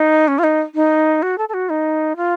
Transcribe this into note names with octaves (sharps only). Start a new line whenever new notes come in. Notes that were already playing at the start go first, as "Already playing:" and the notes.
Already playing: D#4
C#4
F4
D#4
D#4
F#4
A4
A4
F#4
D#4
F4